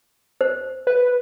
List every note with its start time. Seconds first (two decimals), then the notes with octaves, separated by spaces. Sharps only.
0.41 C5
0.87 B4